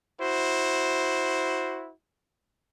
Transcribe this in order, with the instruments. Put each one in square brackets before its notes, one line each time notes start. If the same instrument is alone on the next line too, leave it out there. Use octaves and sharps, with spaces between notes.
[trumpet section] E4 F#4 C5